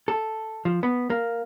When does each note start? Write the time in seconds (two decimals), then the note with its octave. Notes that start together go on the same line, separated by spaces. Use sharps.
0.08 A4
0.65 F3
0.83 B3
1.10 A#3